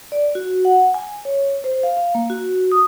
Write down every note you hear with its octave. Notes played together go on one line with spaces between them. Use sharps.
D5
F#4
F#5
G#5
C#5
C5
F5
F5
A#3
F#4
D#6